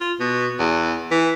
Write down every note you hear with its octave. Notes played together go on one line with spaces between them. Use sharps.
F4
B2
E2
E3